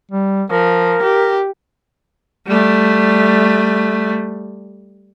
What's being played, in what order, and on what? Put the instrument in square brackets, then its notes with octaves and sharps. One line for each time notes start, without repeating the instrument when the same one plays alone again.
[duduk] G3
[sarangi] F3 [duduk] A#4
[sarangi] G4
[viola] G3 A3